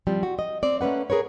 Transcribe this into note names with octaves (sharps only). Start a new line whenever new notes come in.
F3 G3 C4
F#4
D#5
C4 D5
A3 A#3 C#4 B4 F#5
G#4 A#4 B4 C#5